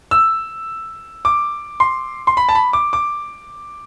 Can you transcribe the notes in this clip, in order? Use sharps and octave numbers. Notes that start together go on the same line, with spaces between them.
E6
D6
C6
C6
B5
A5
B5
D6
D6